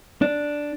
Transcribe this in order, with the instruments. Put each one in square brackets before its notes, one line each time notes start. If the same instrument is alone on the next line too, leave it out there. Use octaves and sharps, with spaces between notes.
[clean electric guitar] D4